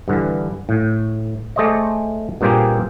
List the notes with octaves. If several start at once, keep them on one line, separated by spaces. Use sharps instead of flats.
G2 D3 E3
A2
A3 G#4 C5 D5 D#5
G2 A#2 A#3 C4 G4 G#4